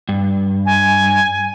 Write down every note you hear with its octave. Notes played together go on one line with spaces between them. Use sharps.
G2
G#5